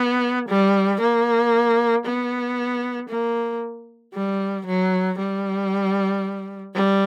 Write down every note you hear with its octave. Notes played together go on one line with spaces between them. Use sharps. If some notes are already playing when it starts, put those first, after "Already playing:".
Already playing: B3
G3
A#3
B3
A#3
G3
F#3
G3
G3